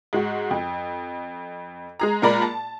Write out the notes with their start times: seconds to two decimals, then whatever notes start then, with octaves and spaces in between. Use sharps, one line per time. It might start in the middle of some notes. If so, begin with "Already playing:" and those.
0.13 G#2 G#3 F#4
0.51 F2
2.00 G#3 G#4 A#5
2.22 A#2 G#3 A#4 D5 B5
2.42 A5